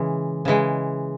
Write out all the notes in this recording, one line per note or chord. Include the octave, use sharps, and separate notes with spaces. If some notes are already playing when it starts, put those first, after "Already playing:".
Already playing: C#3 E3 G#3
C#3 E3 G#3